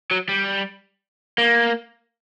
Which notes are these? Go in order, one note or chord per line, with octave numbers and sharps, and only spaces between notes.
F#3
G3
A#3